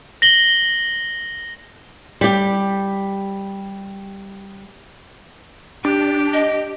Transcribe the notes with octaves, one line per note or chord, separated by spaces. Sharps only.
A#6 F#7 G7
G3 G4
D4 G4
D#5